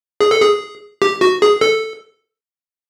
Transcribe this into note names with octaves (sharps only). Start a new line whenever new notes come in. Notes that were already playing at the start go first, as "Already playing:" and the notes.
G#4
A4
G#4
G4
F#4
G#4
A4